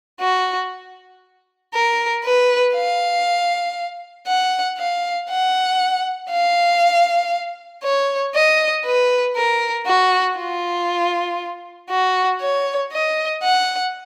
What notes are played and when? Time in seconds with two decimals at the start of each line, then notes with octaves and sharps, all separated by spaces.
0.20 F#4
1.74 A#4
2.24 B4
2.75 F5
4.27 F#5
4.78 F5
5.30 F#5
6.30 F5
7.83 C#5
8.35 D#5
8.85 B4
9.36 A#4
9.87 F#4
10.39 F4
11.90 F#4
12.41 C#5
12.92 D#5
13.43 F#5